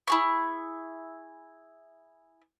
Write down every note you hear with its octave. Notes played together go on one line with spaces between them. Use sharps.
E4 G#4 C#6